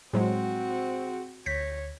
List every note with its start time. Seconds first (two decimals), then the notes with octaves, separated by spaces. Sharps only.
0.13 A2 F#3 G#3 C4 F#4 G#4 C5
1.46 D2 C#5 G6 A#6 B6